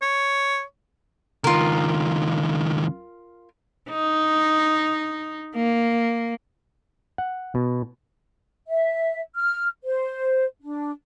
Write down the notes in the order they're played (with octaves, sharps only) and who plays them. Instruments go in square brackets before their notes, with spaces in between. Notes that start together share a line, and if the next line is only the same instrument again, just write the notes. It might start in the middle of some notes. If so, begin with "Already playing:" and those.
[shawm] C#5
[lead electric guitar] C#2 D#3 [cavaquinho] F4 A#4
[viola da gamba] D#4
A#3
[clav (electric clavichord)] F#5
B2
[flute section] E5
F6
C5
D4